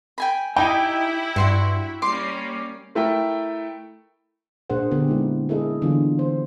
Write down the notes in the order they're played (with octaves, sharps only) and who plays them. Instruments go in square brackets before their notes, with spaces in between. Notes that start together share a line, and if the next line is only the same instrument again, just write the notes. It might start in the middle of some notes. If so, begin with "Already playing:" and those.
[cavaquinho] G5 G#5 B5
[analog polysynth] D#4 G#5 [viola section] E4 [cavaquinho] G4 [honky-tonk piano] G5
[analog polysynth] G2 [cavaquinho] F#4 C6 C#6
[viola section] G3 A#3 C#4 [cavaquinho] C6 [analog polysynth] D6 C7
[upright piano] A3 E4 A#4 G5
[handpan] A#2 A#3 D4 G#4 C5 F#5
D3 A#3 B3 G4
G#3 D#4 E4
A#3 E4 G#4 A4 D#5
D3 E3 F#3 B3 F4
C5